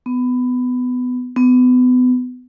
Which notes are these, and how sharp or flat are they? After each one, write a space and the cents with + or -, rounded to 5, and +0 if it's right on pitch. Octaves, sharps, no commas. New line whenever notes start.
B3 +20
B3 +30